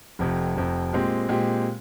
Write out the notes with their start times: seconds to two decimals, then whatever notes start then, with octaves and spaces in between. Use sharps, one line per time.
0.19 F1 F2 C3
0.56 F1 F2 C3
0.93 A#2 G#3 C4 G4
1.29 A#2 G#3 C4 G4